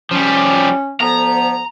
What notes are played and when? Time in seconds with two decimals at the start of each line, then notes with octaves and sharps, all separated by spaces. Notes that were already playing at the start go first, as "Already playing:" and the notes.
0.11 F3 G3 C#4
1.01 D2 F3 B3 A#5